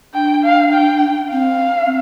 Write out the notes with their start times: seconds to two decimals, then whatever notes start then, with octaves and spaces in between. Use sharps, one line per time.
0.14 D4 G5
0.43 F5
0.73 G5
1.32 C4 F5